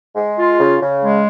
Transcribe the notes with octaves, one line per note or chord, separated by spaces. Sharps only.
G#3
F4
C#3
C#3
G#3